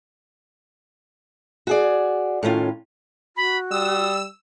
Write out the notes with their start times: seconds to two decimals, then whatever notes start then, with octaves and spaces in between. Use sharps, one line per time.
1.67 F#4 G#4 D5
2.43 A2 D#3 C#4 F4
3.37 F#4 B5
3.71 G3 D#6 E6